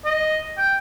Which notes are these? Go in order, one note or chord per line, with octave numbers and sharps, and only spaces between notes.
D#5
G5